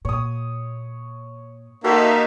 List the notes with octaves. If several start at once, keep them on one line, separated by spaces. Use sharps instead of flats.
A#2 C#5 D#6
A#3 D#4 F#4 A4 C5 E5 F5